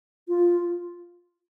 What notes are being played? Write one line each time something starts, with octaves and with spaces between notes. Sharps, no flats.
F4